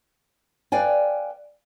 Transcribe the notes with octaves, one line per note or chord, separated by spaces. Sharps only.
B4 D5 F5 G5 G#5